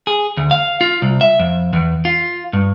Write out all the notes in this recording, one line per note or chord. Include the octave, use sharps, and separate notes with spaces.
G#4
D2
F5
F4
C2
E5
F2
E2
F4
G2